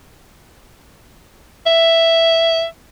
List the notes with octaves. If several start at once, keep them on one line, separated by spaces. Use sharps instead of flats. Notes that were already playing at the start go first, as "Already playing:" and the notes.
E5